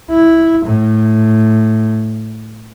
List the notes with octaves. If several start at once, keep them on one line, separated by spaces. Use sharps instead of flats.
E4
A2